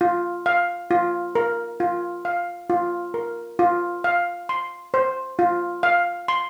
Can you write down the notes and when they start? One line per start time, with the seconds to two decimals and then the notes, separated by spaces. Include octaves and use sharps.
0.01 F4
0.46 F5
0.91 F4
1.35 A#4
1.80 F4
2.25 F5
2.70 F4
3.14 A#4
3.59 F4
4.04 F5
4.49 C6
4.94 C5
5.39 F4
5.83 F5
6.28 C6